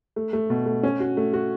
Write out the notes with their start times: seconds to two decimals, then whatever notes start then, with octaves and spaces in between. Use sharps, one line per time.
0.16 A3
0.33 A3
0.50 B2
0.66 A3
0.83 C#4
1.00 F#4
1.17 A3
1.33 F#4